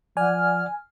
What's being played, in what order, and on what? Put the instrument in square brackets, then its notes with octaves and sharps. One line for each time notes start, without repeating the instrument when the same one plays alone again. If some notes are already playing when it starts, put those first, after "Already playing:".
[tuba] F3 [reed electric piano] D5 F#5 [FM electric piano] G#5 [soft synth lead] F6